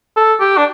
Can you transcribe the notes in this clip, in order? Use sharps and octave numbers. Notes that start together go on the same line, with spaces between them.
A4
G4
D4